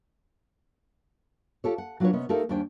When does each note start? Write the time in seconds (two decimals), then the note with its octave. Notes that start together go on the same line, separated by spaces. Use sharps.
1.64 F4 G4 A4 C#5
1.78 F#5
2.00 F#3 D4 F4 A#4 B4 C#5
2.13 C3 B3 C#4 D#5
2.29 A3 D#4 G4 A4 A#4 F5
2.49 D#2 G3 C#4 D4 C5 G5